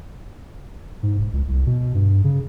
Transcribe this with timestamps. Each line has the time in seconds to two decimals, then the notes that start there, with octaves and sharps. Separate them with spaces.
1.03 G#2
1.18 E1
1.33 C#2
1.48 C2
1.66 B2
1.94 G2
2.24 C#3